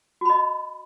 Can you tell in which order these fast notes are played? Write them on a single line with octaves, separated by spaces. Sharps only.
F#4 B5 D#5